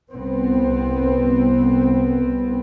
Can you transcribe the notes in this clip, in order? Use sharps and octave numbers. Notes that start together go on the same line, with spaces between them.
C2 B3 C4